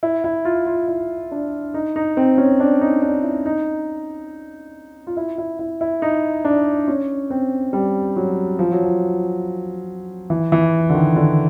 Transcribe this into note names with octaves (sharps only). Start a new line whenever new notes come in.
E4
E4
F4
F4
E4
D4
D#4
D#4
C4
C#4
D4
D#4
D4
E4
D#4
F4
E4
E4
E4
E4
D#4
D4
C#4
C4
G3
F#3
F3
F#3
F3
E3
E3
D3
D#3
D3